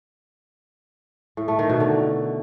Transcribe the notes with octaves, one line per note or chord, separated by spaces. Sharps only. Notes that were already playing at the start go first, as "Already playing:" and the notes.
A2
A3
D#3
B2
D3